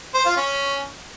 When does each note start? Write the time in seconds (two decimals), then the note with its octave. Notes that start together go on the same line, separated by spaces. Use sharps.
0.14 C5
0.26 F4
0.37 C#4